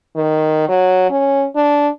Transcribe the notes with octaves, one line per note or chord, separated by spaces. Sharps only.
D#3
F#3
C#4
D4